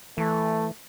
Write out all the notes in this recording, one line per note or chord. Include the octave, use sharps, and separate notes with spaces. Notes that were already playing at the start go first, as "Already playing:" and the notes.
E3 A3